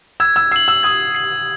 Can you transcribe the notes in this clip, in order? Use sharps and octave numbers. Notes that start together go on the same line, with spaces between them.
E6 G#6
E6
E6 C7 F#7
E6
D#6 G#6
C7 F#7